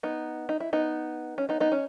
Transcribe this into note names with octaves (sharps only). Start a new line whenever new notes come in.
B3 D#4
D#4
E4
B3 D#4
C#4
B3 D#4
B3 D#4
C#4